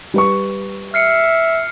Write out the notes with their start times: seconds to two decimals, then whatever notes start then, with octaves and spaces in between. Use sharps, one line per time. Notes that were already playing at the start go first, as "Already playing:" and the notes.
0.14 G3 B4 C#6
0.94 E5 F6 C7 C#7